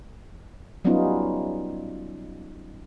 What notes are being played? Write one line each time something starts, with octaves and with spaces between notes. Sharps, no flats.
F#3 G3 B3 C#4 D#4 F4